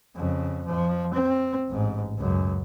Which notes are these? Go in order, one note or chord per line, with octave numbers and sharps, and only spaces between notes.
F2 C#3
F2 F3
C4
A1 G#2
C#2 F#2